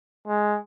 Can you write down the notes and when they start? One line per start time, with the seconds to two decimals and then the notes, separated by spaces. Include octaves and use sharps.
0.27 G#3